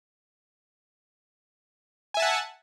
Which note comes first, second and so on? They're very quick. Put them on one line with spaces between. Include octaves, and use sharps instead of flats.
G#5 E5 A5 F#5